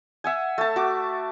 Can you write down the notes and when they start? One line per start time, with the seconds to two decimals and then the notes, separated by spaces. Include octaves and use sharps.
0.24 E5 F#5 G#5
0.58 A3 A5
0.76 F#4 D6